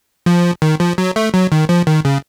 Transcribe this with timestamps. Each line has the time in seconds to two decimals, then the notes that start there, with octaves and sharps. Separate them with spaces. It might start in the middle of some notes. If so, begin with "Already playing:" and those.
0.26 F3
0.62 D#3
0.80 F3
0.98 F#3
1.16 A3
1.34 F#3
1.52 D#3
1.69 F3
1.87 D#3
2.05 C#3